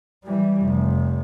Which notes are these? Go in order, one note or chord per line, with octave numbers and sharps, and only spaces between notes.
E3 G3
F1